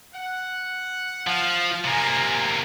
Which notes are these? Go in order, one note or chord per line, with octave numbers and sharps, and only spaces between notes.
F#5
F3 F5
C3 A#3 G#5 A#5